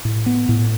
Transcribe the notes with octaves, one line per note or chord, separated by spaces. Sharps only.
A2
B3
A2